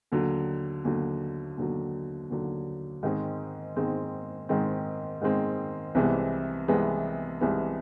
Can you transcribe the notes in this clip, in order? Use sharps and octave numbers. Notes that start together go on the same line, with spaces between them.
D#2 D3 F#3
D#2 D3 F#3
D#2 D3 F#3
D#2 D3 F#3
G#2 D#3 G#3 C4
G#2 D#3 G#3 C4
G#2 D#3 G#3 C4
G#2 D#3 G#3 C4
C2 C3 E3 G#3 B3
C2 C3 E3 G#3 B3
C2 C3 E3 G#3 B3